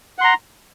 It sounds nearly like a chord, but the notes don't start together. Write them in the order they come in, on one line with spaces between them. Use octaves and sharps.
F#5 C6 A#5